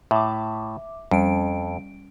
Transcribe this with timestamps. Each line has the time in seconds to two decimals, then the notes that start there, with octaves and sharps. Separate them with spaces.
0.11 A2 E5 D6
1.11 F2 G3 C#4 D7